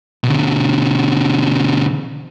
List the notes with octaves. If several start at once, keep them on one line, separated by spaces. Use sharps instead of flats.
B2 D3